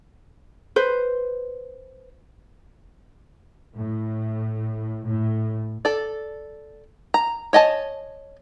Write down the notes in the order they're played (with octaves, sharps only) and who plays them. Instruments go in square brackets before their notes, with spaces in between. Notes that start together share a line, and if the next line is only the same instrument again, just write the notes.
[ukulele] B4 C5
[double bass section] A2
A2
[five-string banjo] A4 D5
A#5
C#5 D#5 G#5 A5